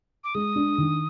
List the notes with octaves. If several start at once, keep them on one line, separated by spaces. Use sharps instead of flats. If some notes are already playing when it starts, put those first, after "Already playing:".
D6
G#3 D#6
D4
D#3